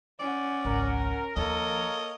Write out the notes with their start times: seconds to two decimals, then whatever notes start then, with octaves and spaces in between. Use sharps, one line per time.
0.20 C#4 D5 F#5
0.65 G#1 C#2 A#4
1.36 D#2 F3 A#3 A4 A#4 C#5 D#5